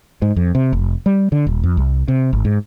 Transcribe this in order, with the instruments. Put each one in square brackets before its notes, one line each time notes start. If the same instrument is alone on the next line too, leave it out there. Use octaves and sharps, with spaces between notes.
[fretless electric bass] G#2
F2
C3
F1
G3
D3
D#1
F2
C2
C3
G#1
G#2